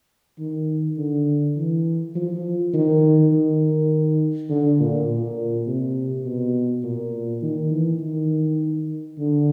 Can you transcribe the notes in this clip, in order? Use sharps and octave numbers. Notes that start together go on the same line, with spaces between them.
D#3
D3
E3
F3
D#3
D#3
D3
A#2
A#2
C3
B2
A#2
D#3
E3
D#3
D3